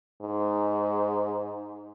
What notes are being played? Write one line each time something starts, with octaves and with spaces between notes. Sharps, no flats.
G#2